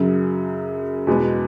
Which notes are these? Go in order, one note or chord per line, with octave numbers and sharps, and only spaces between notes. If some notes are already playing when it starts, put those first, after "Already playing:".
Already playing: F#2 C#3 F#3
E2 B2 G#3 B3